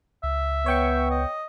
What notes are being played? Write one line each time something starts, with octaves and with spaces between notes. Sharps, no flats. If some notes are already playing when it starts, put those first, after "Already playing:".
C#2 E5
B3 C#5 G5 C#6
D#5